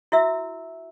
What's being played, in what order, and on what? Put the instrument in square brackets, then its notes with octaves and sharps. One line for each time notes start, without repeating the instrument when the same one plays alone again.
[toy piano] E4 F#4 E5 E6